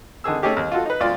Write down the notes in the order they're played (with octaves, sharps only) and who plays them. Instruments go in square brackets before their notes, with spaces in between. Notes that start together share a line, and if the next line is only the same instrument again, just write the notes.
[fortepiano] D3 D#3 G#4 E6
A3 C#4 D#4 G4 G#4
D#2
F4 F#4 A4
D#4 B4
D2 F4 D5